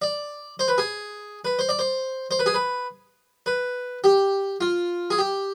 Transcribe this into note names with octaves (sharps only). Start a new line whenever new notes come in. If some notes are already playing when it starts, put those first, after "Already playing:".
D5
C5
B4
G#4
B4
C5
D5
C5
C5
B4
G#4
B4
B4
G4
F4
G#4
G4